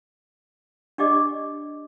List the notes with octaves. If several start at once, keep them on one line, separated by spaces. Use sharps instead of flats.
D4 G4 D5 D#5 D6